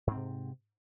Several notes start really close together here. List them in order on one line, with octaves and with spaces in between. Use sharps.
G#2 C4 C3